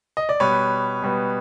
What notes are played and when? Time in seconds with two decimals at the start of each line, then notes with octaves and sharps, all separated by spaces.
0.17 D#5
0.29 D5
0.40 B2 G3 B3 B4 C#5
1.02 B2 G3 B3